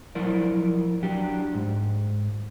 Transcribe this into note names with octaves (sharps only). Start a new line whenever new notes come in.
F3 F#3 E4 A#4 D5
F#3 D4 G4
G#2